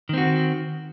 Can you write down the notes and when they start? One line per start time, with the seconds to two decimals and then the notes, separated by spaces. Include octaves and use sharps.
0.09 D#3
0.13 C4
0.18 F#4